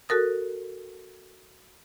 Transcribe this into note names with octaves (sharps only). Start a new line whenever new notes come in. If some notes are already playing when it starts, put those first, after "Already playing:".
F#4 A4 A#4 D#6